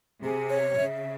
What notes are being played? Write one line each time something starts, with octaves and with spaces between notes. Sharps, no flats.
C3 G#4
C#5
C#3 E5